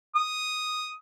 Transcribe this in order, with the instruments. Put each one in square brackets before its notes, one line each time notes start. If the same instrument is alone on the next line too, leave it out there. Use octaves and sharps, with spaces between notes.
[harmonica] D#6